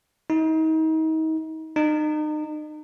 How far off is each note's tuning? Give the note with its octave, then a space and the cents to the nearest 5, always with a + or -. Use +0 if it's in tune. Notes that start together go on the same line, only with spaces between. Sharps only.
D#4 +35
D#4 -35